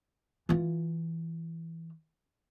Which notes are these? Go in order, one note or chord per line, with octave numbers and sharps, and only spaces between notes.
E3 F4